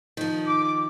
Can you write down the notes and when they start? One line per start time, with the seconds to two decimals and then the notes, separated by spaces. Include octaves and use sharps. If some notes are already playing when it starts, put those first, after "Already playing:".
0.17 D#3 F3
0.47 D6